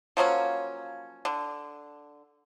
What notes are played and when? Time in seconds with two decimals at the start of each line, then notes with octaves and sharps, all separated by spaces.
0.17 F3 F#3 A#3 C#4
1.25 D3